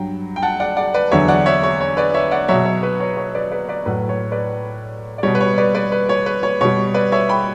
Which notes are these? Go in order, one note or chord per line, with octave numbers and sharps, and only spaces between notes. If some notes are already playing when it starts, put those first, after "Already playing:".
Already playing: G2 F#3 G5
G5
F#5 A5
D5 F#5
D5 F#5
B4 D5
E2 D3 F#3 C#5 E5
D5 F#5
C#5 E5
C#5
C#5
B4 D5
C#5 E5
D5 F#5
B2 F#3 C#5 E5
C#5
B4
C#5
C#5
B4 D5
B4 D5
B4 D5
A2 F#3 B4
C#5
B4 D5
D5
B2 G3 C#5
B4
C#5
B4 D5
B4 D5
B4
C#5
B4
C#5
B2 G3 C#5
B4 D5
C#5 E5
G5 B5